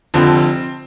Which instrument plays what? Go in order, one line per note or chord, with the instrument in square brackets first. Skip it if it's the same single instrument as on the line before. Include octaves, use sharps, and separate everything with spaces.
[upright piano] F1 F2 D3 F3 C4